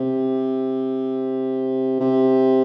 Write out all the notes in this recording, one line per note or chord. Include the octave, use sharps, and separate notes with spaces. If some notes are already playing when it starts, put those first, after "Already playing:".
Already playing: C3
C3